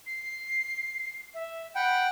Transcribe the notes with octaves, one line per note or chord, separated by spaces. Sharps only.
C7
E5
F#5 G5 B5